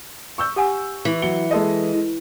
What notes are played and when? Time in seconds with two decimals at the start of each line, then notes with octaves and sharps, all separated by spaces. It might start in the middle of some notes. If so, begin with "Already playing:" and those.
0.38 C#6 E6 G6
0.56 G4 F#5 G#5
1.05 E3
1.22 F#3 C#7 G7
1.51 G#3 A4 D#5